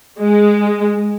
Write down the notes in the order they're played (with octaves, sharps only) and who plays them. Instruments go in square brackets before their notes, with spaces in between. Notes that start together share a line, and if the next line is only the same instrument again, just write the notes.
[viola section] G#3